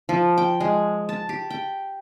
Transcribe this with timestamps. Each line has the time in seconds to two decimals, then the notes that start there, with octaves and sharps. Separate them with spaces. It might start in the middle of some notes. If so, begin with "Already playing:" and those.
0.09 F3
0.38 G5
0.60 G#3
1.09 A5
1.29 G4
1.50 G5